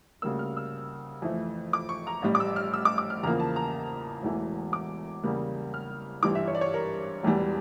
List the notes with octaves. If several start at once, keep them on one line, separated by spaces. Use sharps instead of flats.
D2 C#3 G3 A#3 E6
F6
E6
F2 E3 A3
D6
C#6
A#5
A1 A2 G3
D6
E6
F6
E6
D6
D6
F6
E2 C#3 F3 A#3 A#5
A5
A#5
E1 E2 E3 A3
D6
E2 C#3 G3 A#3
F6
G1 G2 E3 D6
E5
C#5
D5
C#5
A#4
E1 E2 E3 G3